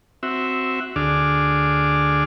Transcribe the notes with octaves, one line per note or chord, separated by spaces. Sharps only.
C4 F#4 E5
D2 D4 G#4 D5 F6